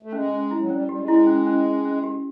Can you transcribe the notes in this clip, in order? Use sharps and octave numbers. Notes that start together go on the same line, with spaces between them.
A3
G#3 C#4
C#4
E4
F#3
G3 C#4
G3 G4
G#3
E4
C#4
C#4
C#4
C#4
G4